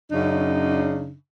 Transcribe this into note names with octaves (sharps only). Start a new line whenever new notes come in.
F#2 C#3 D4 D#4